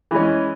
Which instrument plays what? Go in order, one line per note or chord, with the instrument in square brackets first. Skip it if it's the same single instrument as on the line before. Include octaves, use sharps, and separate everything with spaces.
[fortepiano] E3 G#3 C#4